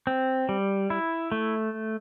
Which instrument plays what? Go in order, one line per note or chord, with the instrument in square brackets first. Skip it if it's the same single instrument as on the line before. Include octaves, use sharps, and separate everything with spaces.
[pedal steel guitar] C4
G3
E4
A3